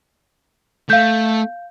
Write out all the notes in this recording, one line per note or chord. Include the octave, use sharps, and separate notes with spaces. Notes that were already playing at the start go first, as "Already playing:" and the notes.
A3 F5 G6